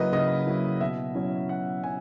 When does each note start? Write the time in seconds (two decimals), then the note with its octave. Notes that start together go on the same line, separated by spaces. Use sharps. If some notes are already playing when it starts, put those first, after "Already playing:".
Already playing: C#3 F#3 A#3 E4 B4 D#5
0.13 C#3 D#5
0.47 F#3 A#3 E4
0.81 B2 E5
1.15 F#3 C#4 E4
1.49 B2 F#5
1.83 F#3 C#4 G#5